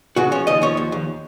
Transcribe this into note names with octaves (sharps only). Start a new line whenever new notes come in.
C#3 F#4
F3 C#5
D#2 D#5
F3 C#5
D#2
D#2